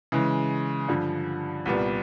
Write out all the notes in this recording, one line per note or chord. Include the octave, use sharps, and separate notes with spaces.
C#3 E3 G#3
G2 D3 F3
C2 A#2 G3 B3